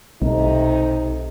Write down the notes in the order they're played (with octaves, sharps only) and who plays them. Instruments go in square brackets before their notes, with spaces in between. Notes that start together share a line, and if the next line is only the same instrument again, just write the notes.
[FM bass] B1 [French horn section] C3 A3 D#4